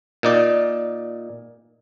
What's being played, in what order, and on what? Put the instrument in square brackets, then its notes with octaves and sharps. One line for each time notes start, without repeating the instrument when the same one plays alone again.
[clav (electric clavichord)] A#2 D#4 D5